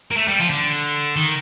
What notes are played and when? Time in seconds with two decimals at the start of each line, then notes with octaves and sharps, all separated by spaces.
0.11 A#3
0.16 A3
0.28 G3
0.40 F3
0.50 D3
1.16 D#3